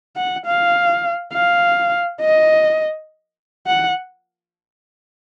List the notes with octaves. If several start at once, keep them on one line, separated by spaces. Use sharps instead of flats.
F#5
F5
F5
D#5
F#5